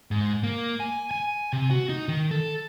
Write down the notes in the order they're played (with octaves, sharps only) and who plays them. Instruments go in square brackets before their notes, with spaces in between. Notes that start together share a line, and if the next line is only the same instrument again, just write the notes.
[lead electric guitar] G#2
A#3
G#5
G#5
C3
F#4
D#4
D#3
A4